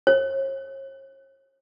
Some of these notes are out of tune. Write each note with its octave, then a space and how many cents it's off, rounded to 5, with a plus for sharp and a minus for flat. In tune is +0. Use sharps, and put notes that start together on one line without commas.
C#5 -45